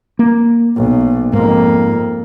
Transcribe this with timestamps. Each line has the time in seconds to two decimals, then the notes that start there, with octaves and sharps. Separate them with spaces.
0.19 A#3
0.76 B1
1.33 F2 G#2 A#3